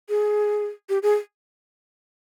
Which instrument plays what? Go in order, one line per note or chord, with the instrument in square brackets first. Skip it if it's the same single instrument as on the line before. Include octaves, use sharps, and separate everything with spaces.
[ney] G#4
G4
G#4